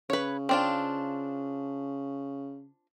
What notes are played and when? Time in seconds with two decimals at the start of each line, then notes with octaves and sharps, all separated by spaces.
0.10 C#3 B4 C#5
0.49 C4 D4 F4